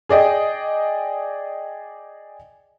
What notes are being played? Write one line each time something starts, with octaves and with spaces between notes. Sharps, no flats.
G#4 D5 D#5 G5